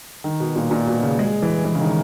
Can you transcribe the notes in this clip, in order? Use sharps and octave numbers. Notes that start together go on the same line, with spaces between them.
D#3
B2
A#2
A#2
B2
C#3
G#3
E3
E3
C#3
D#3